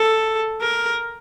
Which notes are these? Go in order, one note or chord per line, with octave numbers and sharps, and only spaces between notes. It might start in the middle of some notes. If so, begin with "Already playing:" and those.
Already playing: A4
A#4